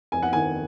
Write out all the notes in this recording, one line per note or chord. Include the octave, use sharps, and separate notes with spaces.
F1 G#5
F#5
D#3 G#5